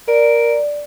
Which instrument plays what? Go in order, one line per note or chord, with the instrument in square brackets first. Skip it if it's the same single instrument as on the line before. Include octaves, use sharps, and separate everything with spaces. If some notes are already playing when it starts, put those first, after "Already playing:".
[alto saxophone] A#4 [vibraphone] D5